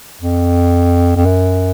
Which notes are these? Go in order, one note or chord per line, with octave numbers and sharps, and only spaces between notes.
F2
F2
F#2